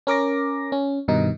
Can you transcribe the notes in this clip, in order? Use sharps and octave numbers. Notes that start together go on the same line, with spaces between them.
C#4 A#4 D6 A#6
C#4
G2 B2 D#3 D#4